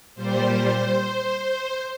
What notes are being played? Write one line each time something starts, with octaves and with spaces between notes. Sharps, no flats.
A#2 G3 C5